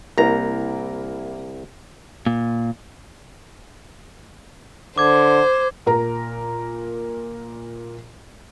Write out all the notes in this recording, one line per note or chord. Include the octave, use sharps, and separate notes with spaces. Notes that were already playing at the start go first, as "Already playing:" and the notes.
C2 A#3 E4 A#4 A#5
A#2
D3 C5 D6 G#6
A#2 A#4 A#5